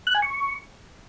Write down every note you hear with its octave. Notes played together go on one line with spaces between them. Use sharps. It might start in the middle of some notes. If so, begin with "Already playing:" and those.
F#6
G#5
C#6